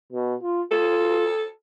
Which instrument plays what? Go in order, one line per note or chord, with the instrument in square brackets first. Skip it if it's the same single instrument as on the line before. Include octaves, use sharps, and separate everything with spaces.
[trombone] B2
F4
[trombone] F4 [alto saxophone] A4